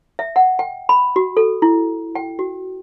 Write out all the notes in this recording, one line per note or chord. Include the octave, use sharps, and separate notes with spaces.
E5
F#5
G5
B5
F#4
A4
E4
G5
F#4